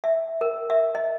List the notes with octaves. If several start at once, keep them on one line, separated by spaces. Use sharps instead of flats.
E5
A#4
E5
D#5